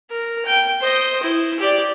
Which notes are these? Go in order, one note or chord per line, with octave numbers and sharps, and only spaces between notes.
A#4
G5
C5 D#5
E4
G4 D5